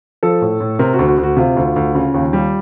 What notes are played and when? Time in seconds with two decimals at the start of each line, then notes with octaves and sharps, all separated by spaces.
0.23 F3 A4
0.41 A2
0.60 A2
0.79 C3 A#4
0.94 F#4
0.99 D2
1.08 F#4
1.18 D2
1.23 F#4
1.37 C3 F4
1.57 D2
1.76 D2
1.95 C#3 F4
2.14 D#2
2.33 G3